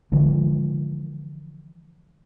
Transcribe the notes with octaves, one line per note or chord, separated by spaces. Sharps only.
D3 E3 F3 G#3